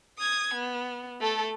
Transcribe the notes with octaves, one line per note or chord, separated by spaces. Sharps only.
D#6 G#6
B3
A3 A4